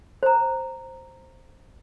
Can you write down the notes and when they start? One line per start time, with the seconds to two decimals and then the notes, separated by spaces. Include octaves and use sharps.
0.23 C5 A#5